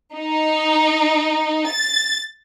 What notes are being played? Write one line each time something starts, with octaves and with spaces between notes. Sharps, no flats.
D#4
A6